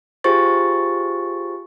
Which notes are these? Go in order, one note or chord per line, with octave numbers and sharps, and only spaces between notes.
F4 G4 G#4 C5 C#6 A6